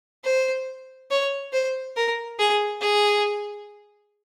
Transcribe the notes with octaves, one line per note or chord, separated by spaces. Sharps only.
C5
C#5
C5
A#4
G#4
G#4